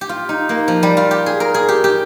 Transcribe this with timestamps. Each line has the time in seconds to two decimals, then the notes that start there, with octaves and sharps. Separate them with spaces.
0.01 G4
0.09 F4
0.29 D#4
0.49 A#3
0.68 F3
0.83 G3
0.97 F4
1.11 G4
1.26 G#4
1.40 A#4
1.54 G#4
1.69 G4
1.84 G4